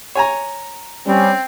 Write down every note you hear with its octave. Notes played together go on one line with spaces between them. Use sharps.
C#5 G#5 A#5
G3 C4 C#4